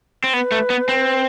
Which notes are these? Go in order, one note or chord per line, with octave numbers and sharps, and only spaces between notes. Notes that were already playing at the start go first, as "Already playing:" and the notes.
C4
B3 B4
A3
B3
C4